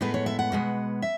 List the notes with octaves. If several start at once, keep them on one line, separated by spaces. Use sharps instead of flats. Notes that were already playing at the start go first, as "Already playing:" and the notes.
A2 G#3 B3 B4
C#5
E5
F#5
B2 G#3 B3
E5